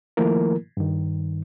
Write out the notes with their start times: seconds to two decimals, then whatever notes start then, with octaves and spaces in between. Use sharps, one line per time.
0.17 D#3 F3 A3 A#3 E4 A#4
0.77 G2 D#3